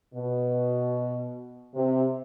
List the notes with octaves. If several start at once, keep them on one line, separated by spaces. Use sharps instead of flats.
B2
C3